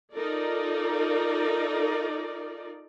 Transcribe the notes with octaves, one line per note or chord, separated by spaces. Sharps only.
D#4 F4 A4 A#4 D5